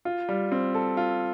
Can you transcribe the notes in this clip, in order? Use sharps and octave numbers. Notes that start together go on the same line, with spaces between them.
F4
G3
C4
A4
F4